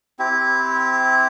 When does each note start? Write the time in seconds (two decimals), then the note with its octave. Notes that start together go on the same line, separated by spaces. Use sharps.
0.19 C4 E4 G4